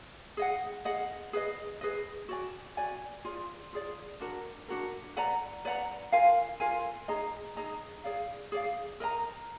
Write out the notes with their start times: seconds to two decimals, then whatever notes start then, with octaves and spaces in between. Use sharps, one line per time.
0.37 G#4 D#5 F#5
0.85 G#4 D#5 F#5
1.33 G#4 B4 D#5
1.81 G#4 B4 D#5
2.29 F#4 D5 G#5
2.77 F#4 D5 G#5
3.25 F4 G#4 D5
3.73 F4 G#4 D5
4.20 D4 F#4 A#4
4.68 D4 F#4 A#4
5.17 B4 D5 F#5 A#5
5.65 B4 D5 F#5 A#5
6.12 F4 A#4 F5 G#5
6.60 F4 A#4 F5 G#5
7.08 D#4 G#4 D#5 A#5
7.57 D#4 G#4 D#5 A#5
8.04 G#4 D5 F5
8.52 G#4 D5 F5
9.00 A#4 D#5 A#5